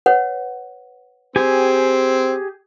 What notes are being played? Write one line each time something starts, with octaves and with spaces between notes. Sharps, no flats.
B4 C#5 F#5
C4 G4 G#4 G#5